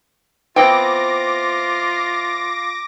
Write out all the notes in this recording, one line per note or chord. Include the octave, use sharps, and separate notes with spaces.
E3 B3 C4 F4 G5 D6 A#6